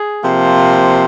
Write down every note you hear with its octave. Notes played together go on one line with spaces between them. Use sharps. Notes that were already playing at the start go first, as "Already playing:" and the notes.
Already playing: G#4
C3 F3 A#3